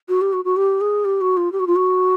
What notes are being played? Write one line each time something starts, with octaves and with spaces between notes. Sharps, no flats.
F#4
G4
F#4
F#4
G4
G#4
G4
F#4
F4
G4
F#4
F4
F#4